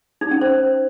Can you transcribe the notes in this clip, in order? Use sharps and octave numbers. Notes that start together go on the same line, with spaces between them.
D#4
C#4
C5